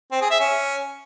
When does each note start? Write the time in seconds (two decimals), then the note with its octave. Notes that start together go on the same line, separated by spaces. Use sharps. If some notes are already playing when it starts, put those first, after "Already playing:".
0.12 C4
0.21 G#4
0.31 E5
0.40 C#4